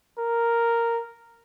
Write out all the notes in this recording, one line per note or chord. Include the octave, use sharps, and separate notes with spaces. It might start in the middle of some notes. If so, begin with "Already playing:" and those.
A#4